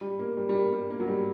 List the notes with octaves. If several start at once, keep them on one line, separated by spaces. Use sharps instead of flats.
G3
A#3
G3
G3
A#3
G3
A#3
F#3
G3